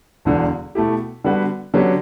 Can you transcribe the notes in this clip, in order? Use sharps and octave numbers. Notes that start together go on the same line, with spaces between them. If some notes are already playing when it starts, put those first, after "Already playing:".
E1 E2 D3
B2 A3 E4 G4
D3 G3 B3 F#4 B4
D3 F#3 C#4 G4 B4